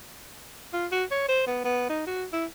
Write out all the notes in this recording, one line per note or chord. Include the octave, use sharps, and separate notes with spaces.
F4
F#4
C#5
C5
B3
B3
D#4
F#4
E4